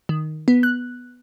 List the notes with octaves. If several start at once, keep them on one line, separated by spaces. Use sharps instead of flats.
D#3
B3
F#6